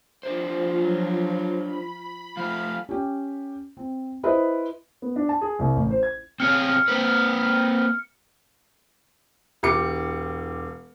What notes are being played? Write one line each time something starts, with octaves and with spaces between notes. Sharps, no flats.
F3 D4 F4 G4 C5
F#3
B5
F3 A3 F5
C#4 G4
C4
E4 B4 C5 D#5 E5
B3
D4
A5
G#4
C2
A1
C5
G#6
C4 G#4 C#5 F6 C#7
A#3 C4 B4
E1 G4 D6 C#7